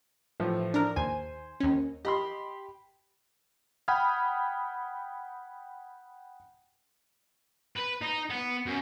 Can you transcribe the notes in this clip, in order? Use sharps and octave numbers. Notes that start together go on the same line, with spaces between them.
A2 E3 F3
D4 A#4
D#2 C5 G#5
D#2 C#4
G4 D#5 B5 C6
F#5 G5 B5 D#6 F6 G#6
B4
D#4
B3
F#2